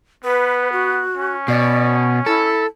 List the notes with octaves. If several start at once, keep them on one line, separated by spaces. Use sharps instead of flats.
B3 B4
F#4
C#4
B2 D5
E4 A4